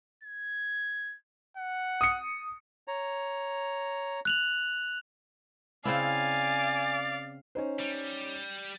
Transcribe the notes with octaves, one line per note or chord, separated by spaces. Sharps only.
G#6
F#5
D#6 C#7
C#5 A#5
F#6 F7 F#7
C#3 C4 E4 D5 F5 G#5
C#4 D#4 C5
G3